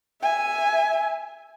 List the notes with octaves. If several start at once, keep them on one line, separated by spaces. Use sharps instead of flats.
E5 G#5